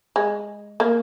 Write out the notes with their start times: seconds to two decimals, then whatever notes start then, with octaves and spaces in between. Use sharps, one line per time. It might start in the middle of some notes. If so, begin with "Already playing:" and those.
0.16 G#3
0.80 A#3